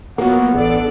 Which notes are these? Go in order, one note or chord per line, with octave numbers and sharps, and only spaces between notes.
F#3 A#3 B3 F4 F#4
A1 D4 A4 D5